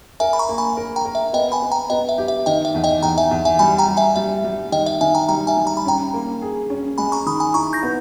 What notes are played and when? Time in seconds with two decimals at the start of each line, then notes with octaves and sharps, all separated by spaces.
0.20 A#4 E5 G#5
0.33 B5
0.39 A#5 C#6
0.49 A#3
0.58 G#5 B5
0.77 A#4
0.96 G5 A#5
1.05 A#4
1.15 E5
1.33 B3 D#5 G5
1.52 G#5 B5
1.62 B3
1.72 G5 A#5
1.90 B3 D#5 G5
2.09 E5
2.18 G4
2.28 E5
2.46 D#3 D#5 G5
2.65 E5
2.74 E2
2.84 D#5 G5
3.03 E2 G5 A#5
3.18 E5 G#5
3.31 E2
3.45 E5 G#5
3.59 G3 G#5 B5
3.78 G5 A#5
3.88 G3
3.97 E5 G#5
4.16 G3 E5
4.44 G3
4.72 D#3 D#5 G5
4.86 E5
5.01 D#3 E5 G#5
5.15 G5 A#5
5.29 G3 G5 A#5
5.47 E5 G#5
5.57 G3
5.67 A#5
5.77 B5
5.85 C#4 G5 A#5
6.14 A#3
6.42 G#4
6.70 C#4
6.98 G#3 G#5 B5
7.12 A#5 C#6
7.26 D#3 B5 D#6
7.40 G#5 B5
7.54 E4 A#5 C#6
7.73 G6 A#6
7.83 B3